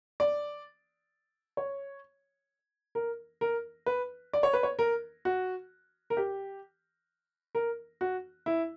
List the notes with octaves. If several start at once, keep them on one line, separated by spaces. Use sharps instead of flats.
D5
C#5
A#4
A#4
B4
D5
C#5
B4
C#5
A#4
F#4
A#4
G4
A#4
F#4
E4